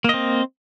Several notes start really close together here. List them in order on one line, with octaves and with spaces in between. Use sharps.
A#3 D#5 C4